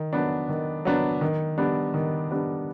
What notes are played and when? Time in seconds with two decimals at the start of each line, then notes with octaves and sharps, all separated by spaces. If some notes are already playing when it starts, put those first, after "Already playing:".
Already playing: D#3
0.13 F#3 B3 D4
0.49 D#3
0.85 F#3 B3 D4
1.21 D#3
1.57 G3 B3 D4
1.94 D#3
2.31 G3 B3 D4